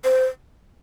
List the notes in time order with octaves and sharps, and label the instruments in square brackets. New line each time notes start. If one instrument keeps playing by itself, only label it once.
[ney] C5